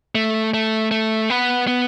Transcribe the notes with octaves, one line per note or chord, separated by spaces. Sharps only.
A3
A3
A3
B3
B3